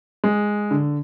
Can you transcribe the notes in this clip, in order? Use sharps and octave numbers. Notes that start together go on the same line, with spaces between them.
G#3
D3